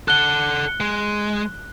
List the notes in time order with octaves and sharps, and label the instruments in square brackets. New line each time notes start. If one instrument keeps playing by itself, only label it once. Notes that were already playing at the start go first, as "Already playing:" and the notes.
[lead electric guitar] A4 F#5 [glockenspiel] F#6 G7
[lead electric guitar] G#3